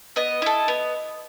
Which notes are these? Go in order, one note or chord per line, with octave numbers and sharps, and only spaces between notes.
B3 D#5
E4 A4
B3